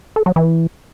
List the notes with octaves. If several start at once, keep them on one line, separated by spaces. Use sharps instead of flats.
A4
F#3
E3